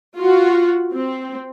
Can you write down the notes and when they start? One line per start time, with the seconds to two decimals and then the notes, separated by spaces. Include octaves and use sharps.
0.17 F4 F#4
0.93 C4